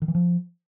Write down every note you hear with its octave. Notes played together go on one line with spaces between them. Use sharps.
D#3
E3
F3